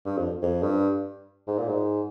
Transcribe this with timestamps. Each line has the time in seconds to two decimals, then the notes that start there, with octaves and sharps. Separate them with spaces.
0.05 G2
0.18 F2
0.42 F2
0.63 G2
1.47 G#2
1.58 A#2
1.69 G#2